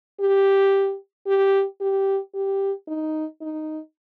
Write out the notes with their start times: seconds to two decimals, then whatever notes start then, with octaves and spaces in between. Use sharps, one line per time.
0.20 G4
1.27 G4
1.81 G4
2.34 G4
2.88 D#4
3.42 D#4